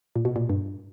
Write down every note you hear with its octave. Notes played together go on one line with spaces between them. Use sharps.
A#2
B2
A#2
G2